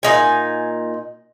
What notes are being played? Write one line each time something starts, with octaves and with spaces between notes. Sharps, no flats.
A#2 D#4 G#5